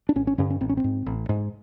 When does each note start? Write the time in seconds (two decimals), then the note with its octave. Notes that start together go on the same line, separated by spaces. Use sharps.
0.09 D4
0.16 G#1 C#4
0.27 C#4
0.38 G2 D3 C#4
0.50 C#4
0.61 A1 C4
0.69 C#4
0.77 C4
0.84 G#2
1.06 A1
1.29 G#2